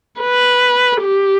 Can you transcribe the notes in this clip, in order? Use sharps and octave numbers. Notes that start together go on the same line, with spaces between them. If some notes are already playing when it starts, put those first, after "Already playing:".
B4
G4